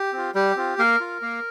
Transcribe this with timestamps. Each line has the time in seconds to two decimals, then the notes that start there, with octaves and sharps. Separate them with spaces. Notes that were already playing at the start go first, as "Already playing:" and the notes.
Already playing: G4
0.13 C4 F4
0.35 G3 G4
0.56 C4 F4
0.78 A#3 A#4
1.00 F4
1.22 A#3